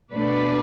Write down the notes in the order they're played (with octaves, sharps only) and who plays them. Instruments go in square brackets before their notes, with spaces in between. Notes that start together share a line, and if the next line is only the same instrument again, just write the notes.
[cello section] B2 A3 D4 B4 D5